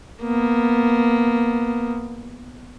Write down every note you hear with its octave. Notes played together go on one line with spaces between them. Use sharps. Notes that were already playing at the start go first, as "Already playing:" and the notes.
A#3 B3